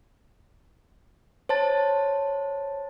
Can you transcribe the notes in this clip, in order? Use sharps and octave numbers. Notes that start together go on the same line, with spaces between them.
C5 C#5 A5 A6